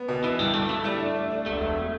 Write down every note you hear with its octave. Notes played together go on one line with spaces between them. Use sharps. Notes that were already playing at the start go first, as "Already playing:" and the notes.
Already playing: B3
B2
E3 E4
G2 G3
G2 A3
A3 E4
G3 A3
D4
D4
D4
E1 A3
E1